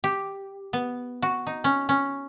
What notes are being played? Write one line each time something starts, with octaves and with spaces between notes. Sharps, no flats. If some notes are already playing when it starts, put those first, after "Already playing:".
G4
B3
F#4
D#4
C#4
C#4